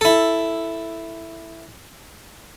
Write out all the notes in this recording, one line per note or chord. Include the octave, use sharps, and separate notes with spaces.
E4 A4